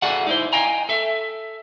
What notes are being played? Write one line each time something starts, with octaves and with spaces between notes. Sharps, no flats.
A3 F#4 G#4 D5 F5 F#5
D#4 E4 C5
D#5 F5 G5 G#5 A#5
A4 E5